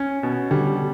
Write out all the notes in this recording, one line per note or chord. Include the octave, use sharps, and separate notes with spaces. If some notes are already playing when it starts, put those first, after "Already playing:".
Already playing: C#4
B2
D3 G3